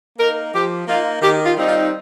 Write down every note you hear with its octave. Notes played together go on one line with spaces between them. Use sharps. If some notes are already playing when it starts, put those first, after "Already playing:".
A#3 D#4 A#4
F3 G4
A#3 D#4 F4
D#3 G4
F4
G3 C4 D#4
F4